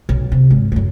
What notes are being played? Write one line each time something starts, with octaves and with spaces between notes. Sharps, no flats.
B1
C3
G#1
F#2 A2